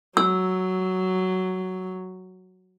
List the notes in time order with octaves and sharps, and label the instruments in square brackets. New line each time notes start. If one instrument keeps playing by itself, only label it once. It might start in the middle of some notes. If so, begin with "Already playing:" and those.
[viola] F#3 [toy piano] E6